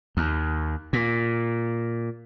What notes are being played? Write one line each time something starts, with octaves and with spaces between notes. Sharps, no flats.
D#2
A#2